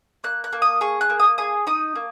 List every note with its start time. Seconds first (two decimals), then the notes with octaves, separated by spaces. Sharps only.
0.24 A#3 F#6
0.44 F#6
0.53 A#3
0.62 D#6
0.81 G#4 C#6
1.01 F#6
1.10 A#3
1.20 D#6
1.38 G#4 D#6
1.67 D#4 D#6
1.95 A#3